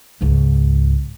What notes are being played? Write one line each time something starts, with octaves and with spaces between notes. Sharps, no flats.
C#2 G#2